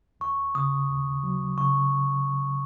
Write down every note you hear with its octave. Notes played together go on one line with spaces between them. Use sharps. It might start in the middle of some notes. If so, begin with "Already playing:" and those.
D#2 C#6
C#3 D#6
D#2
F#3
C#3 C#6